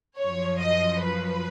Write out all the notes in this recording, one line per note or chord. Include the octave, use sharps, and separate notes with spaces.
F#2 F3 C#5
D#5
B4